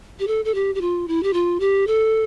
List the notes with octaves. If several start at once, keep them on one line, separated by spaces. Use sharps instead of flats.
G4
A4
A4
G4
G4
F4
E4
G4
F4
G4
A4